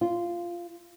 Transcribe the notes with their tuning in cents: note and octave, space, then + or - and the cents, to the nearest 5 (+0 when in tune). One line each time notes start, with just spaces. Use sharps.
F4 -10